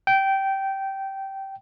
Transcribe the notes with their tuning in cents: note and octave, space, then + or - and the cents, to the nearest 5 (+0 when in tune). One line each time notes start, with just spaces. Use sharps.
G5 -15